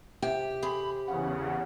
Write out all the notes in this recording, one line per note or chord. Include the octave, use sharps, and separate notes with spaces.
C3 G4
C4 G#4 B5
E2 C#3 F#5